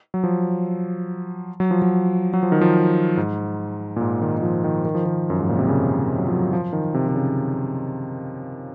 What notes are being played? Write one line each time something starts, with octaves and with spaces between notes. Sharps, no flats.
F#3
F3
F#3
F3
F#3
F#3
F3
D#3
F3
G#2
A#2
G#2
D#3
D#3
F3
D#3
D#3
F3
D#3
F#2
G#2
A#2
C3
C#3
F#3
F3
F#3
F3
D#3
C3
C3
C#3